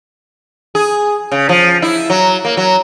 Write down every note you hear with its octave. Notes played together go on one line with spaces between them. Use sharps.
G#4
C#3
F3
E4
F#3
A#3
F#3